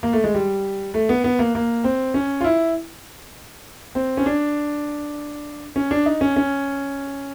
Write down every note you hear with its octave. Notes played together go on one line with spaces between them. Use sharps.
A#3
A3
G#3
G3
A3
B3
B3
A#3
A#3
C4
C#4
F4
E4
C4
C#4
D4
C#4
D4
D#4
C#4
C#4